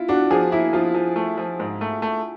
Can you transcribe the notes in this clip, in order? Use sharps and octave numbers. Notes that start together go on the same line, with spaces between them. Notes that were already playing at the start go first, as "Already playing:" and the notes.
Already playing: E4 F4
D4 F#4
F3 G#4
A#3 E4
F3 F4
F3
A3
F3
G#2
A3
A3